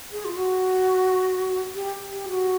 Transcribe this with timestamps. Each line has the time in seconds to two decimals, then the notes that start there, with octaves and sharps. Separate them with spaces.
0.12 G#4
0.25 F4
0.35 F#4
1.75 G4
2.11 G4
2.29 F#4